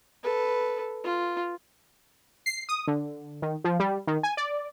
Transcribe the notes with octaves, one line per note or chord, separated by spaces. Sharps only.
A4 B4
F4
C7
D#6
D3
D#3
F3
G3
D#3
G#5
D5